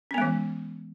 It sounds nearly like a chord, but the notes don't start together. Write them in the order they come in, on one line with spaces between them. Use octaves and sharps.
C#4 B3 G#3 E3